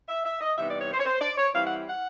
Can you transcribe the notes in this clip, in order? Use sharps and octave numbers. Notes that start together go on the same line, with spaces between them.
E5
E5
D#5
C3 E3 G3 B3 D#4 E5
D5
C#5
C5
C#5
C5
D5
C#5
E3 G3 C4 E4 F5
F#5
F#5